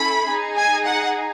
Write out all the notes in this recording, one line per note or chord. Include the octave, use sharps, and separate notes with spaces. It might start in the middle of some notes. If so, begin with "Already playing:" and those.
Already playing: C#4 E4 A4 B5
D#4 G#4
G#5
F#5